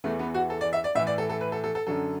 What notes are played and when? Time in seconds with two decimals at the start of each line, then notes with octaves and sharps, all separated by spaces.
0.04 E2 E3 A3
0.19 B3
0.34 F#4
0.50 A4
0.61 D5
0.73 E5
0.84 D5
0.95 A2 E5
0.99 E3
1.07 D5
1.18 A4
1.30 A4
1.41 B4
1.52 A4
1.64 A4
1.75 A4
1.87 F#2 D3 F#3 A4